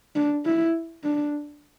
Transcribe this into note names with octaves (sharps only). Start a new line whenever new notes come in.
D4
E4
D4